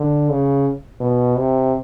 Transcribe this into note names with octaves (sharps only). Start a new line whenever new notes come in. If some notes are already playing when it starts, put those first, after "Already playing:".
Already playing: D3
C#3
B2
C3